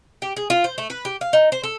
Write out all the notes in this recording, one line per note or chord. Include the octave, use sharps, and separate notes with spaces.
G4
G#4
F4
C5
A3
B4
G4
F5
D#4
C5
A4